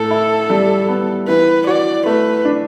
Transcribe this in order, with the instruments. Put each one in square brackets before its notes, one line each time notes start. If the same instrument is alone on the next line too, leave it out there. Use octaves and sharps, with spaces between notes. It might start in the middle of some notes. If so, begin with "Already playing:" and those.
Already playing: [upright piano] A2 [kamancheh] A4
[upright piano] E4
G3
B3
[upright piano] E3 [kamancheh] B4
[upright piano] F#4 [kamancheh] D5
[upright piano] A3 [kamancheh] B4
[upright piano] D4